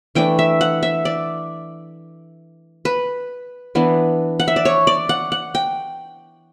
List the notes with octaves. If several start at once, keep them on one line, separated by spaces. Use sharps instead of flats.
E3 A3 D4 G5
E5
F#5
E5
D5
B4
E3 B3 D4
F#5
E5
D5
C#5
D5
F#5
F#5
G5